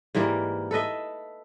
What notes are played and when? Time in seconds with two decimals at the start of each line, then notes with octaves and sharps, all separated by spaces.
0.15 G#2 E3 G3 A#3
0.71 A4 B4 D#5 E5